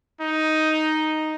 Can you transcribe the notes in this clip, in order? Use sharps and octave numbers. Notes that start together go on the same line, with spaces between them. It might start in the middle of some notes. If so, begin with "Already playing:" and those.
D#4